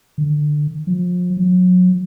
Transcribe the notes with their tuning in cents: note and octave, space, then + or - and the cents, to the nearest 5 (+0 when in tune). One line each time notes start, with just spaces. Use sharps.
D3 +15
F3 +35
F#3 -30